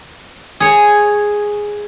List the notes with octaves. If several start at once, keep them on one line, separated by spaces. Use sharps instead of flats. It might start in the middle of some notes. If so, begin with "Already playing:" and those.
G#4 C#5